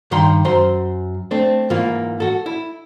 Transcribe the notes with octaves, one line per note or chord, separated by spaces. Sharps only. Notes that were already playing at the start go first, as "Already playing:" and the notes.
G2 D#3 G5 A#5 C6
F#2 C5 A#5 C6
A3 C4 D4
G#2 E3 A#3 F4
F#4 A4
E4